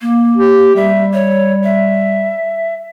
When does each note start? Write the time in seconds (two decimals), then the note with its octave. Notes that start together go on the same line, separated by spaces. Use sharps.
0.02 A#3
0.37 G4
0.75 G3 E5
1.13 C#5
1.64 E5